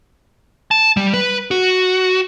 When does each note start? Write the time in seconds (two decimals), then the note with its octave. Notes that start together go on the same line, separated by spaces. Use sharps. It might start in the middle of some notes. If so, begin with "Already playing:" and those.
0.71 A5
0.97 G3
1.14 B4
1.51 F#4